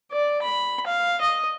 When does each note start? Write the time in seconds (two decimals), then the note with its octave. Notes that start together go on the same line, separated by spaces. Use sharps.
0.12 D5
0.42 B5
0.87 F5
1.21 D#5